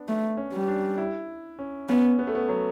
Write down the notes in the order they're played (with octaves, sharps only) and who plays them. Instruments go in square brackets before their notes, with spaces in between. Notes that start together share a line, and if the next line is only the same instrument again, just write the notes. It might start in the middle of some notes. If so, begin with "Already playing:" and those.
Already playing: [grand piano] B3 D4
[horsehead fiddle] A3
[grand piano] C#4
[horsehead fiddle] G3
[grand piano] D4
E4
C#4
[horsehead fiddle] B3 [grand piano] C#4
[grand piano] B3
A3
B3
F#3